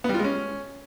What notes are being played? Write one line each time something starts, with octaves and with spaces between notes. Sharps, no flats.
B3
G3
F4
G#3
C#4